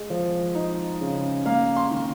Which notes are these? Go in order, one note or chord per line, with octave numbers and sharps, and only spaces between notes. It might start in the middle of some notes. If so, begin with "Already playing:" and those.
Already playing: G#3 D#5
F3
D#4
C#3
A#3 F5
C6
D#3